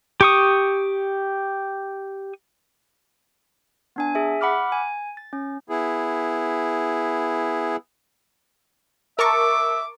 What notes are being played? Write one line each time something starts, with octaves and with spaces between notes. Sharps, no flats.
G4 C#6 D#6
B3 D4 G#5
G#4 E5
F#5 B5 D6 F6
G#5
A6
C#4
B3 E4 G#4
A#4 E5 A5 C#6 D6